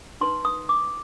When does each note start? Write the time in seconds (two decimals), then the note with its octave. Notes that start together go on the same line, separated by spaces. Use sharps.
0.21 D#4 B4 C6
0.45 D#6
0.69 D6